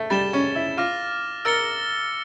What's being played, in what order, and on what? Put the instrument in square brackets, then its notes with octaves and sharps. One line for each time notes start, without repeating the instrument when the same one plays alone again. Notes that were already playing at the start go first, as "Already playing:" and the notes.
Already playing: [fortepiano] A3
[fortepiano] G3 [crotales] A6 E7 G7
[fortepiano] C#4
E4
[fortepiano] F4 [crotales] D6 F6 A#6
[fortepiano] A#4 [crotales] E6 A6 C#7 G7